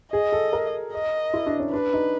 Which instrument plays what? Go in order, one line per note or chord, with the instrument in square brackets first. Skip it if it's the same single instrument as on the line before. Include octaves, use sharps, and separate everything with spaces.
[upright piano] G#4 [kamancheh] D#5
[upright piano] A4
A#4
[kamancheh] D#5
[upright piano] E4
D4
C#4
[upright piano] D4 [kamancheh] B4
[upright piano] D#4